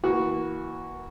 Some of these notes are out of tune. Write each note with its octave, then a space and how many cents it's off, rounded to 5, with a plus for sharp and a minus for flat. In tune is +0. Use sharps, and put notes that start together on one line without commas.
E3 -15 A#3 +15 F#4 +0